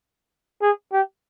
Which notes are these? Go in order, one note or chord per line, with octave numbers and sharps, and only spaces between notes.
G#4
G4